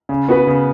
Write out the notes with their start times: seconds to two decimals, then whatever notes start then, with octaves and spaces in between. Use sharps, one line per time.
0.09 C#3
0.28 B3 F#4 B4
0.47 C#3